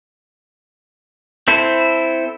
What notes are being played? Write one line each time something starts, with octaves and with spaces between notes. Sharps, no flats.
C4 E4 A4 C5